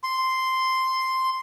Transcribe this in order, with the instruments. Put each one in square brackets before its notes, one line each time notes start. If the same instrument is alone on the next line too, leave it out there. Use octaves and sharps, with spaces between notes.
[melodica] C6